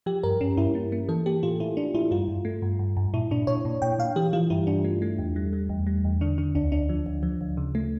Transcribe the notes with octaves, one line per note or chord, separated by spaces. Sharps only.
F3 G4
G2 A#4
G2 C#4
G2 E4
A#3
A#3
E3 A4
A#3 G4
A2 F4
A2 E4
A2 D4
A2 E4
G2 F4
G2
A3
G2
G2
G2
A#2 E4
A#2 D4
A#2 C#5
A#2
A#2 G5
A#2 F5
E3 G4
E3 F4
G2 E4
G2 D4
A3
A3
E2
G3
G3
E2
G3
E2
D3 D4
D3 D4
D2 D4
D2 D4
F3
D2
F3
D2
C#3
A3